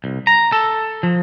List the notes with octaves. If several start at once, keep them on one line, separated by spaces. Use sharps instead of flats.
C2
A#5
A4
F3